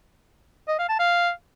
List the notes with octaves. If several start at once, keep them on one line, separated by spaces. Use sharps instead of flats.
D#5
F5
A5
F5